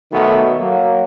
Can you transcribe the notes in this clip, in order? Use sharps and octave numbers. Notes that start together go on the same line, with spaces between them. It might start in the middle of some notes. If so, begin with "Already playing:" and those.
B1 B2 D#3 A3 B3 F#4
F#3 A#3